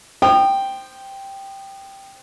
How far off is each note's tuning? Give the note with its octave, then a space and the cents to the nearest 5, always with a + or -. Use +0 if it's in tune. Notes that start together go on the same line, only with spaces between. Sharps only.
C5 +0 G5 +0 D#6 -35